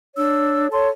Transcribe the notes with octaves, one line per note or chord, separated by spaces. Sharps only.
D4 C#5 E6
A4 C#5 A5 C6